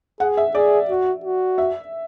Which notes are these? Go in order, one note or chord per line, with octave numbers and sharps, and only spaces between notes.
G#4 F#5
E5
G#4 D5
F#4
F#4
E5